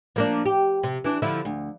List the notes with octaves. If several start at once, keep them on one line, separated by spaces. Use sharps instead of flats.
F3 A#3 D4
G4
C3
E3 D4
D3 F3 E4
D2